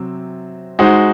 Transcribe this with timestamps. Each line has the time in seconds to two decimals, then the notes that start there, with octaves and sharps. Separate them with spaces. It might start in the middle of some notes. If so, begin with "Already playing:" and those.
Already playing: C3 F#3 C4
0.79 G#3 D#4 F#4 C5